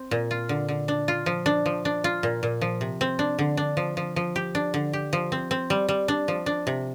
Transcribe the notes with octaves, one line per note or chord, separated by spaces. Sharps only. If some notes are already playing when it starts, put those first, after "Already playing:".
Already playing: C4
A#2
F4
D3
D3
D4
F4
F3
D4
F3
D4
F4
A#2
A#2
F3
C3
C4
D4
D3
D4
F3
F3
F3
G4
D4
D3
G4
F3
C4
C4
G3
G3
D4
F3
D4
C3